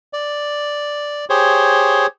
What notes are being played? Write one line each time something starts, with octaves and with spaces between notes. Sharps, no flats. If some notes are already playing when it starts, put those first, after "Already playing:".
D5
G4 G#4 C5 C#5